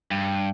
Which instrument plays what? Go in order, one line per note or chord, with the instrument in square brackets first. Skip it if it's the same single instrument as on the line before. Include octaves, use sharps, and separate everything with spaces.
[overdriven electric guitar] G2